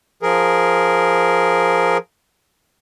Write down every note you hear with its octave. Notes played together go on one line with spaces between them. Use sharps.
F3 G#4 A#4